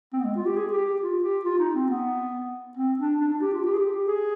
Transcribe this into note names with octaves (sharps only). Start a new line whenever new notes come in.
C4
B3
G#3
F4
G4
G#4
G4
G4
F4
G4
F4
D#4
C4
B3
C4
D4
D4
D4
G4
F4
G4
G#4
G4
G4
G#4